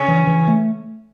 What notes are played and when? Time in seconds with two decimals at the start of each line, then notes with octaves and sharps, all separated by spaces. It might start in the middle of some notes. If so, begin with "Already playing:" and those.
Already playing: C#3 C#4
0.08 E3
0.27 E3
0.48 A3